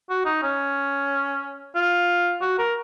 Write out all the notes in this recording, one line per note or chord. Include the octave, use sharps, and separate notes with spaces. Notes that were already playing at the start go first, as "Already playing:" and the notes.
F#4
D#4
C#4
F4
F#4
A#4